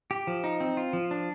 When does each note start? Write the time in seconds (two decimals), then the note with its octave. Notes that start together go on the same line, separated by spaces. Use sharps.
0.11 G4
0.27 F3
0.44 D#4
0.60 C4
0.77 F4
0.93 F3
1.11 D4